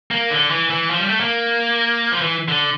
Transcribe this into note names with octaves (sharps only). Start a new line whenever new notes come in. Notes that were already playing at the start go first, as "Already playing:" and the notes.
A#3
D3
E3
E3
F3
G3
A3
A#3
F3
E3
D3